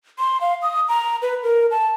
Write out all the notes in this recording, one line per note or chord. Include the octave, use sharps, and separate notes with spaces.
C6
F5
D#6
A#5
B4
A#4
A5